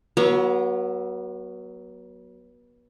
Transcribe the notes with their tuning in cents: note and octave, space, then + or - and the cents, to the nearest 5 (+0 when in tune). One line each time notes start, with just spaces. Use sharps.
F#3 +10 B3 -35 A#5 +0